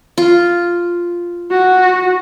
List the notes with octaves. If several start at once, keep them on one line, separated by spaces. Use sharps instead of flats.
F4
F#4